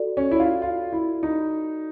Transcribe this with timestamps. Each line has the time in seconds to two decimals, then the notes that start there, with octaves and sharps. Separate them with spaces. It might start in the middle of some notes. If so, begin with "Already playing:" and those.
Already playing: F#4 A4 D5
0.17 C#4
0.31 E4
0.40 F4
0.62 F4
0.92 E4
1.23 D#4